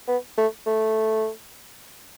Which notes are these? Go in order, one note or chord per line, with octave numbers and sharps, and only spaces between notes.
B3
A3
A3